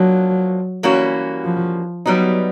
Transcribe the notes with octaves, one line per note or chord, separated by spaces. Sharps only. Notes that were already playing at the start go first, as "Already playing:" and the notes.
Already playing: F3 F#3 A#3 D4
E3 G3 A#3 C#4 F#4
F3
F#3 G3 B3 D#4